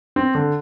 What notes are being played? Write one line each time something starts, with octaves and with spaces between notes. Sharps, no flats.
C4
D3